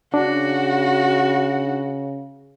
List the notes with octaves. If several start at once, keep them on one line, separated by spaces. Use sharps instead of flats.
C#3 D4 F#4